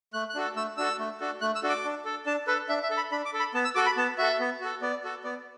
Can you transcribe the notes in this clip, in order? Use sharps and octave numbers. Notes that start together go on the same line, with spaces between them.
A3 F#6
F#6
D4 F#4 A4
A3 E6
D4 F#4 A4 E6
A3
D4 F#4 A4
A3 F#6
E6
D4 F#4 A4
D6
D4
A4
D4 A5
A4 B4
D4 E5
E5
A4
B5
D4 B5
D6
A4
B5
B3 A5
E6
F#4 A4 D6
B5
B3 A5
F#4 A4 E5
B3
F#4 A4
B3 D5
F#4 A4
B3 D5